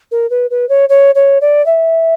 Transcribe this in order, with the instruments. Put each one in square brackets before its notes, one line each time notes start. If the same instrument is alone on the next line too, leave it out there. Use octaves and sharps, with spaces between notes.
[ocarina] A#4
B4
B4
C#5
C#5
C#5
D5
E5